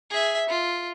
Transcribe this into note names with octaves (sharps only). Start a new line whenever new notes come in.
G#4 E5
F4